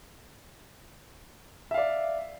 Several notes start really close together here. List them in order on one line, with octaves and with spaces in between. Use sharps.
E5 F5 D5